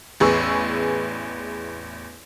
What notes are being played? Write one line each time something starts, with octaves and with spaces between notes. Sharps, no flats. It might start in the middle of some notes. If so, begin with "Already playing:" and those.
A1 E2 G#4 B4 C#6 E6